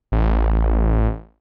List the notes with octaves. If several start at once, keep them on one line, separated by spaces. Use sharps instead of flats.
A1